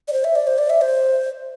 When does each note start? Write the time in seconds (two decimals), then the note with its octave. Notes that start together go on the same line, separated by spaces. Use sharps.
0.08 D5
0.13 C5
0.24 E5
0.35 D5
0.47 C5
0.58 D5
0.70 E5
0.81 C5